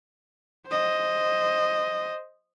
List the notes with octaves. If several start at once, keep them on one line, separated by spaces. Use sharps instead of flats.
C5 D#5